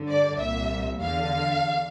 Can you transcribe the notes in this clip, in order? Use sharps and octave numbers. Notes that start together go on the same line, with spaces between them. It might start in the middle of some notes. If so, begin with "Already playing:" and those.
Already playing: G2 D3
D5
C2 A#2 E5
E2 D3 F5